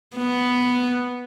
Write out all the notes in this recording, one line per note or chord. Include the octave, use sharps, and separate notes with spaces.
B3